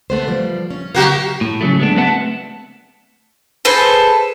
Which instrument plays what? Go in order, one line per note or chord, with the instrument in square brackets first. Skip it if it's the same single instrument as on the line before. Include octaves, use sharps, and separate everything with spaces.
[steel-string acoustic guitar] A3 B3 C5
F3 G3
C#4
[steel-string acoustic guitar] C#3 F#3 F5 [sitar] A#3 F#4 G4
[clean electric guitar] A2
C#3 F#3 A3
G#3 B3 D4
A3 C4 B4 E5 F#5 A5
[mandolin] G#4 A4 B4 C5